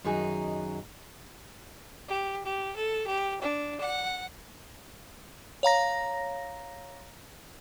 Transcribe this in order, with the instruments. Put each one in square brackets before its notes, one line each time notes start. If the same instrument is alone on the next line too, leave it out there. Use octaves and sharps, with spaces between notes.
[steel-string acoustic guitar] F#2 D#3 D#4 F#4 G#4 A#5
[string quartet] G4
G4
A4
G4
D4
F#5
[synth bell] C#5 F5 A#5 A#6